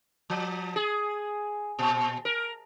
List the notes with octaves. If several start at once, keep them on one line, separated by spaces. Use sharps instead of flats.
F3
G#4
A#2
A#4